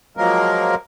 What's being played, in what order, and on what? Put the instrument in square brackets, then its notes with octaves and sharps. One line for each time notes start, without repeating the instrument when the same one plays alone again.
[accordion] F3 F#3 G#3 A#3 A#4